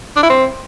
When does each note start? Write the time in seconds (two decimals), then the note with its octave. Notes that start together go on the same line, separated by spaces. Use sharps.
0.16 D4
0.23 E4
0.30 C4